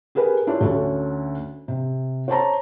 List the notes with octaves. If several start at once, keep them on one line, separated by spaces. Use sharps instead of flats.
G4 G#4 A#4 B4 G#5
D4 E4 F4 G4 C#5 D5
D2 D3 C#4 A4 C#5
C3
C5 C#5 A5 A#5